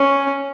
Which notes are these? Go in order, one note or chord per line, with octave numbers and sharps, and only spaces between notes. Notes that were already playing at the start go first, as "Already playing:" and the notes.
Already playing: C#4